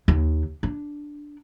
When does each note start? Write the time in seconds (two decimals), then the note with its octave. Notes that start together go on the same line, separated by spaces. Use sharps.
0.08 D#2
0.63 D4